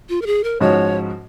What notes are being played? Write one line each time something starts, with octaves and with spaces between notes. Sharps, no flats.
F4
A#4
G#4
A#4
G#2 F3 G#3 C#4 F#4 C#5